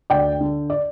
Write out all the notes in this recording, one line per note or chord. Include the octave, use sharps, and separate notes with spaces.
D2 D5 G5
D3
D5